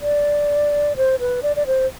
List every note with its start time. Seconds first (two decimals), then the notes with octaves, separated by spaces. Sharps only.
0.02 D5
0.97 C5
1.20 B4
1.43 D5
1.56 D5
1.67 C5